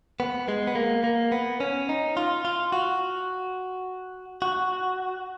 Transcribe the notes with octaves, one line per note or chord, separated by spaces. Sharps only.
B3
G#3
B3
A#3
A#3
B3
C#4
D#4
F4
F4
F#4
F#4